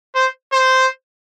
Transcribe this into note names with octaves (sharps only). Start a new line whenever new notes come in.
C5
C5